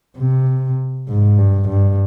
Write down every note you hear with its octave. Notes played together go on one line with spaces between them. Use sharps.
C3
G#2
G2
G2